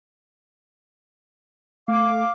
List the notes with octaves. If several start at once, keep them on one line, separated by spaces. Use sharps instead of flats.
A3 F5 D6